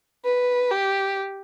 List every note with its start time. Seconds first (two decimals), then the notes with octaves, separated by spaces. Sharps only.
0.25 B4
0.71 G4